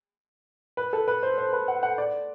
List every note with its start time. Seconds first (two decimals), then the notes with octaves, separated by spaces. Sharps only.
0.77 B4
0.93 A4
1.08 B4
1.23 C5
1.38 C5
1.53 B4
1.68 F#5
1.83 F#5
1.98 D5